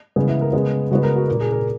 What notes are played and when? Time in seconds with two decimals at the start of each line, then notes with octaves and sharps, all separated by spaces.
0.16 C#3 E3 G#3 B3 G#4
0.29 E4
0.41 A#4
0.53 C#3 G#3 B3 G#4
0.91 C#3 G#3 B3 F#4
1.03 A#4
1.16 F#4
1.28 A#2 A#3
1.41 G#4
1.52 A#4